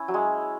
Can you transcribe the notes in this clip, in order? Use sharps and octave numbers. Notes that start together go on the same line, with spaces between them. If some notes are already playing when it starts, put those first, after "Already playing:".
Already playing: C#4 E4
F#3
G#3